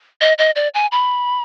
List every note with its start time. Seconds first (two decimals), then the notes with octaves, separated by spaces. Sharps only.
0.21 D#5
0.38 D#5
0.56 D5
0.74 G#5
0.92 B5